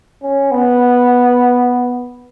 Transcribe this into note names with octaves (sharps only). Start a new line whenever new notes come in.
C#4
B3